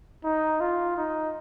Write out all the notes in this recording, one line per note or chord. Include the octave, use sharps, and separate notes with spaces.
D#4
F4
D#4